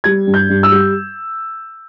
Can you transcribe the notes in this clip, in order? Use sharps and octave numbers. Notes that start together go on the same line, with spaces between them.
G3 G#6
G2
G6
G2
E6
G3